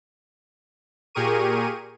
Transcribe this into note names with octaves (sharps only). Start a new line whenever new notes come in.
A#2 G4 G#4 A#4 C#6 D#7